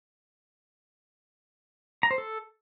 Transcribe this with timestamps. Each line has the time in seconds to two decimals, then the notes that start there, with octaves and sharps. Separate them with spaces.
2.03 A#5
2.11 C5
2.18 A4